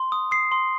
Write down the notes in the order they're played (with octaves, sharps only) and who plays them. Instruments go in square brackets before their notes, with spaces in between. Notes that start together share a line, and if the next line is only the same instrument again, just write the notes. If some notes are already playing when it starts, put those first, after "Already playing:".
Already playing: [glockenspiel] C6
D#6
D#6 C7
C6